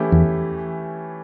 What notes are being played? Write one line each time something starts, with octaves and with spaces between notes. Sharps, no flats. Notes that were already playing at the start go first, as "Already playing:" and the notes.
Already playing: E3 A3 C#4 E4 G4
E2